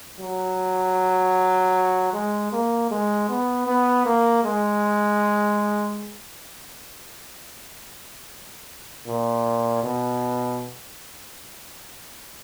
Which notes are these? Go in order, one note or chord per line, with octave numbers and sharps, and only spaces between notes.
F#3
G#3
A#3
G#3
B3
B3
A#3
G#3
A#2
B2